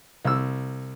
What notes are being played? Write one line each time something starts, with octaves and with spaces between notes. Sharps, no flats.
C2 E6